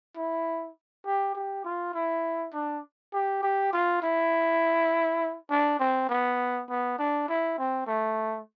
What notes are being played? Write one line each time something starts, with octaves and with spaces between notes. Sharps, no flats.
E4
G4
G4
F4
E4
D4
G4
G4
F4
E4
D4
C4
B3
B3
D4
E4
C4
A3